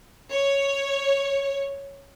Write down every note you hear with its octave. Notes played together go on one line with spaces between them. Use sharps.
C#5